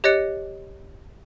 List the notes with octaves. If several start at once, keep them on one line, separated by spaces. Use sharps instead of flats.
G4 C#5 D#5 F#6 A6 C#7